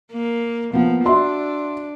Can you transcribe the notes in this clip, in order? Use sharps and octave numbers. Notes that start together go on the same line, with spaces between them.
A#3
F3 A#3 B3
D4 F#4 E5 C6